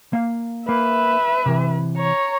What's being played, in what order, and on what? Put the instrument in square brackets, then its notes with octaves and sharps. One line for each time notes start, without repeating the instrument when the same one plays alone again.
[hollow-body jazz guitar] A#3 F5
[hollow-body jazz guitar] A#3 [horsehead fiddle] B4 [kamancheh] E5
[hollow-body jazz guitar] C3 E3
[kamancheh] C#5 A#5